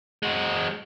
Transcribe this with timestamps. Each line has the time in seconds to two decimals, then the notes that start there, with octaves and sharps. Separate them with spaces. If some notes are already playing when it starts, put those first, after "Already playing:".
0.23 G#3 F#4